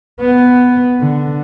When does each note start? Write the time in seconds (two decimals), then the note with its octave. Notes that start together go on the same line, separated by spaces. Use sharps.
0.21 B3
1.00 D3